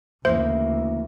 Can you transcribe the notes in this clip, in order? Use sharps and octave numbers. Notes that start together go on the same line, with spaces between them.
D2 C#3 E3 A#3 C5 E5